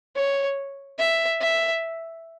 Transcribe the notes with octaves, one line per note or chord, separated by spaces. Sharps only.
C#5
E5
E5